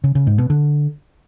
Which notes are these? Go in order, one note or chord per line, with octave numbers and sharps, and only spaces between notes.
C#3
C#3
G#2
B2
D3